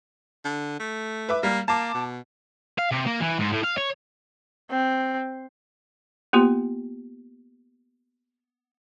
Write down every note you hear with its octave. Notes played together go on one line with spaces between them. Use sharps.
D3
A3
B4 E5 D6
G3 A#3
A#3 A5 D6
B2
F5
C3
A#3
E3
G#2
A2
F5
C#5
C4
A#3 B3 F4 G4